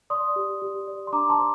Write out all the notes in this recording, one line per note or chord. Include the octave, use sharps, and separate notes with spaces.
D5 C6 D#6
G4
G4
D5
C6
D4 A#5 D6
A5 C6
C5